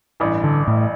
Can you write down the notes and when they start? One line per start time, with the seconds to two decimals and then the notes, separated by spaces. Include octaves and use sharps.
0.20 A1 G2 E3
0.44 D3
0.68 A2